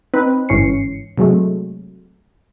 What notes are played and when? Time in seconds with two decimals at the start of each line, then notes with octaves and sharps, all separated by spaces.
0.14 C4 D#4 B4
0.49 G1 G#2 E3 C#4 C7 C#7
1.18 C3 F#3 G#3 A3